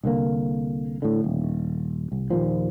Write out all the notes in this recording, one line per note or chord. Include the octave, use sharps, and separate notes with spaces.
C2 D3 A#3
A2 D3
D#1
C2
D#2 A#2 F3